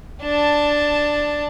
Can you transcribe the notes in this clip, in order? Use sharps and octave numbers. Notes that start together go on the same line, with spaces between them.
D4 A5